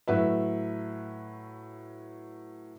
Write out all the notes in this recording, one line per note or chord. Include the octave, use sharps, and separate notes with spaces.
A2 F#3 B4 E5